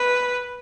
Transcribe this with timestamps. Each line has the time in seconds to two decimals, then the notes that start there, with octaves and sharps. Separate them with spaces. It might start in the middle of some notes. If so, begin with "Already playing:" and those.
Already playing: B4